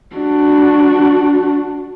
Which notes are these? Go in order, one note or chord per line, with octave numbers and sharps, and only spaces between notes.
D4 F#4